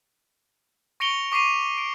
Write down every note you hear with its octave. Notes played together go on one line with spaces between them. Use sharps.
C#6 A#6 C#7 D7 F7 G7
C#6 D6 B6 C7 D#7 F7
D7